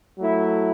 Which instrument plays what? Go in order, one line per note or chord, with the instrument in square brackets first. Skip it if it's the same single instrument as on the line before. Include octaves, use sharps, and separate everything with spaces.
[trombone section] F#3 A3 E4